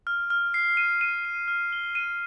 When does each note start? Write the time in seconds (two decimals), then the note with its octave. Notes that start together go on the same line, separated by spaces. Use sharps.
0.07 F6
0.30 F6
0.54 C7
0.77 D#7
1.01 D#7
1.25 D#7
1.48 F6
1.73 G7
1.95 D#7